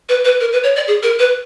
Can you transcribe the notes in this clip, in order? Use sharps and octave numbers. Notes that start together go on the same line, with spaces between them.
B4
B4
A#4
B4
C#5
D5
G#4
A#4
B4